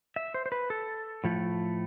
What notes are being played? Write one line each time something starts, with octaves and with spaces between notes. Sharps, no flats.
E5
C5
C5
B4
A4
A2 F3 A3